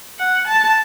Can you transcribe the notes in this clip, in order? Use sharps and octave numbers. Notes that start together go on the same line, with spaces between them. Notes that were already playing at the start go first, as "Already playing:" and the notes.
F#5
A5